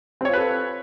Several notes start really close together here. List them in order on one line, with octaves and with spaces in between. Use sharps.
C4 C#5 F4 B4 A4